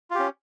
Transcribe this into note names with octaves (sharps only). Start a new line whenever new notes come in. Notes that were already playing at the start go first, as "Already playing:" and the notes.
C#4 F4 G4